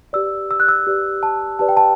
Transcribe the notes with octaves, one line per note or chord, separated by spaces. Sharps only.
G4 B4 D5 E6
E6
F#6
E6
G4 B4 D5
A5
G4 B4 D5 A5
G5
A5